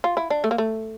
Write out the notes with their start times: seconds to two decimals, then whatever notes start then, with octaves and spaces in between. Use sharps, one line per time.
0.04 F4
0.17 E4
0.30 D4
0.44 A3
0.51 A#3
0.58 A3